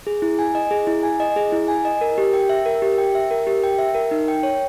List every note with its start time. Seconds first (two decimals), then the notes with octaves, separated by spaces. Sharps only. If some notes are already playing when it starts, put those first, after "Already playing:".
0.07 G#4
0.22 E4
0.39 G#5
0.55 D#5
0.71 G#4
0.87 E4
1.03 G#5
1.20 D#5
1.36 G#4
1.52 E4
1.68 G#5
1.85 D#5
2.01 A#4
2.18 G4
2.33 G5
2.49 E5
2.66 A#4
2.82 G4
2.98 G5
3.15 E5
3.31 A#4
3.47 G4
3.64 G5
3.79 E5
3.95 A#4
4.11 D#4
4.28 G5
4.43 C#5